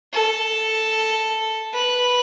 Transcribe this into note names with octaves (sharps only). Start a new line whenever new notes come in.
A4
B4